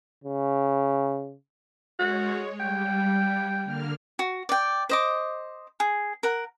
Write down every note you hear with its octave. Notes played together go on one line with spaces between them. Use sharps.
C#3
G#3 F#4 C#5
G3 G5
D3 A#3 F6
F#4
D5 G5
C5 D#5 D6
G#4
A#4 F#5